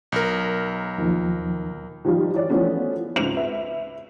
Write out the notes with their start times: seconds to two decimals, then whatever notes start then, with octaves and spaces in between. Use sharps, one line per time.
0.12 B1 A#4
0.98 D#2 D#3 F3
2.05 D#3 F3 G3 D#4 F4
2.32 E3 C#5 D5
2.49 E3 F3 A3 B3 C#4 F#4
3.16 C#2 G#2 C4 F7
3.36 B4 E5